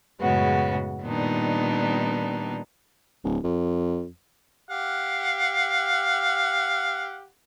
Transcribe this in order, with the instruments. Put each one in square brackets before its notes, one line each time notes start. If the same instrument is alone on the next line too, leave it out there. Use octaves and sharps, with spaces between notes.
[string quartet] F#2 A2 C#3 G#3 B3 F#4
A#2 D#3 G3 B3 D4 D#4
[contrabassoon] D1
F2
[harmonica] G4 F5 F#5